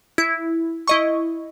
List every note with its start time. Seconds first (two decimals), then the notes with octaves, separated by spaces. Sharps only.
0.18 E4
0.88 E4 D#5 C#6